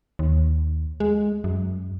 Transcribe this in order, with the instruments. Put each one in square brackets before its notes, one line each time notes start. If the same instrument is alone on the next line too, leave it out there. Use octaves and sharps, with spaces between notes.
[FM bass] D#2
G#3
F#2